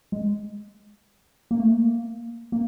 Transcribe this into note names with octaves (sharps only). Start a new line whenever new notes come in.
G#3
A#3
A3
A#3
A#3